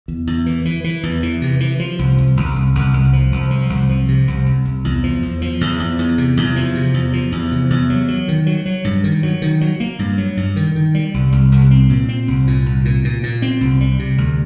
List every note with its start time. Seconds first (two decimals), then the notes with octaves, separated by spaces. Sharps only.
0.08 E2
0.27 E2
0.46 E3
0.65 E3
0.84 E3
1.03 E2
1.23 E3
1.42 C3
1.60 E3
1.79 F3
1.99 C2
2.18 C2
2.37 C2
2.56 C2
2.75 C2
2.94 C2
3.13 F3
3.32 C2
3.51 F3
3.70 C2
3.89 F3
4.08 C3
4.28 C2
4.46 C2
4.65 C2
4.85 E2
5.04 F3
5.23 E2
5.42 F3
5.61 E2
5.80 E2
5.99 E2
6.18 C3
6.37 E2
6.56 F3
6.75 C3
6.94 E2
7.13 F3
7.32 E2
7.51 C3
7.70 E2
7.90 F#3
8.08 F#3
8.28 D#3
8.47 F#3
8.66 F#3
8.85 G2
9.04 D#3
9.23 F#3
9.42 D#3
9.61 F#3
9.80 A#3
9.99 G2
10.18 F#3
10.37 G2
10.56 D#3
10.75 D#3
10.95 G3
11.14 C2
11.32 C2
11.52 C2
11.71 C4
11.90 A#2
12.09 C4
12.28 C2
12.47 A#2
12.66 C2
12.85 A#2
13.04 A#2
13.23 A#2
13.42 C4
13.61 C2
13.81 G3
13.99 C3
14.18 D2